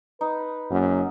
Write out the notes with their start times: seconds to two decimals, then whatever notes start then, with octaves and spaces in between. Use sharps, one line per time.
0.21 D#4 B4
0.71 F#1 F#2